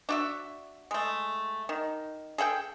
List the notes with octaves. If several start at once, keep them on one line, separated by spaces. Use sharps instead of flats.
D4 F#4 E5
G#3 A3
D#3
G#4 A4 F#5 G5